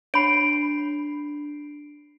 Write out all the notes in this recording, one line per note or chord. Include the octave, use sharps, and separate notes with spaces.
D4 C#5 B5 C7 D7